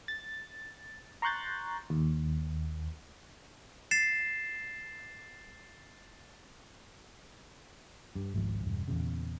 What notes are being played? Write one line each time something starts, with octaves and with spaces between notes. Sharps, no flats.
A6
A#5 C6 C#6 F#6 G6 A6
D#2
A6 C7 E7
G2
G#1 C#2 G#2 F3
E1 G2
E2 A#2 C#3